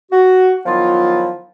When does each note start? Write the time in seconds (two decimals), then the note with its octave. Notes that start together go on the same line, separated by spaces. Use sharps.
0.12 F#4
0.66 D#3 F3 F#3 B3 E4 F4